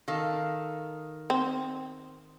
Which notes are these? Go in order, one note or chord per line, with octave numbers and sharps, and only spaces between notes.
D#3 A4 F5
C4